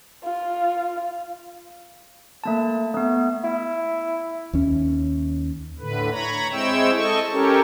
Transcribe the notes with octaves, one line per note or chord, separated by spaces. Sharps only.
F4
A3 A#3 A5
A3 B3
E4
D#2 C#4
A2 D3 B4
C#5 A#5 B5
G#3 C4 E4 C#5 G5 E6
A4 D#5 C#6
C#4 G4 A4 A#4 C#5